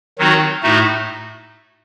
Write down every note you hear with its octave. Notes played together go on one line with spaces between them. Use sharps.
D#3 F#3 C4 D#4 F#4
A2 A3 D#4 F#4